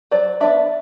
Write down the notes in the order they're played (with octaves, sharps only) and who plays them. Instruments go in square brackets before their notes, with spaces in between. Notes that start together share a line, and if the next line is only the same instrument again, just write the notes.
[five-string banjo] F#3 C5 D5
B3 D4 D5 E5